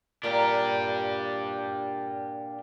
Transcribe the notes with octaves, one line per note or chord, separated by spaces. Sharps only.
A#2 D4 G4 A#4 D5